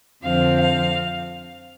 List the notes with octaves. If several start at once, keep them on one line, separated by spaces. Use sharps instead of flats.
F2 D3 F3 C4 F5
F5